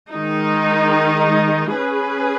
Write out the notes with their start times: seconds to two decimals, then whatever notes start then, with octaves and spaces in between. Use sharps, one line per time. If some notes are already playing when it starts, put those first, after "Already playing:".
0.11 D#3 G#3 D#4
1.75 C#4 G#4 B4